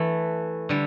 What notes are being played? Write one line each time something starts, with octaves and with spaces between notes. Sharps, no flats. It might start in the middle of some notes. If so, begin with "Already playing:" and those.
Already playing: E3 A3
D3 G3